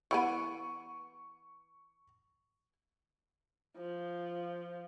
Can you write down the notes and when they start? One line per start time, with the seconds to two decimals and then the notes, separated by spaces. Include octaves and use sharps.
0.11 E3 G3 B3 C#6 D7 D#7
3.78 F3